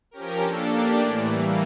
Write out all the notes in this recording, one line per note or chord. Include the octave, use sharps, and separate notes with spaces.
F3 C#4 G4 A#4
A#3 D4 A4
A#3 D4 G4 D5
A2 E3 A3
E3 G3 A#3